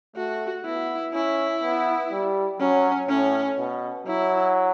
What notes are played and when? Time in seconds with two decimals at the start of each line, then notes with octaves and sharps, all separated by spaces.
0.16 A3 F#4
0.65 B3 E4
1.14 C#4 E4
1.63 B3
2.11 G3
2.60 F#3 C#4
3.09 A2 C#4
3.58 B2
4.06 F#3 E4